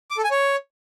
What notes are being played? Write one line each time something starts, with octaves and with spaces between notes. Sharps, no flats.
D6
A4
G#5
C#5